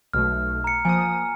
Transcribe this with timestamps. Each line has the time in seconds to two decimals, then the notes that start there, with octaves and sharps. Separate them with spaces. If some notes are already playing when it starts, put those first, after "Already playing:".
0.13 B1 B2 A3 F6
0.64 A#5 C#7
0.85 F3 A#3 G#5 D#6